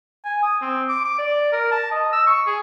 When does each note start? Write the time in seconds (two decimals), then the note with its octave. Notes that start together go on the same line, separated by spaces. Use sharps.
0.25 G#5
0.43 D#6
0.62 C4
0.89 D6
1.05 D6
1.19 D5
1.52 A#4
1.72 A5
1.92 D#5
2.13 E6
2.27 C#6
2.47 G#4